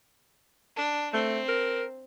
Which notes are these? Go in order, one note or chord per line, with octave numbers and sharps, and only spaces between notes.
D4
A3 C4
A#4